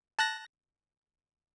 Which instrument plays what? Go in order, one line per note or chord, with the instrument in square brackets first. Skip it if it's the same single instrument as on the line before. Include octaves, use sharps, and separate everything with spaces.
[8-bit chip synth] A5 F#6 A#6